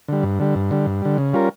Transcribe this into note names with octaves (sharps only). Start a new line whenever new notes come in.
D3 G3
G2
D3 G3
G2
D3 G3
G2
D3 G3
C#3
G3 C#4 F4 A#4